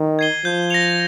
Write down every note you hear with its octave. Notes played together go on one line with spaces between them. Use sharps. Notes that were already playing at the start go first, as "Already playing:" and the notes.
Already playing: D#3
G#6 C7 D#7 G7
F3 G6
A#6 C#7 F7